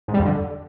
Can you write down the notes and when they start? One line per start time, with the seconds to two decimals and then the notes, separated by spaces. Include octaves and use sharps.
0.08 G#2
0.14 G3
0.19 F2
0.25 D3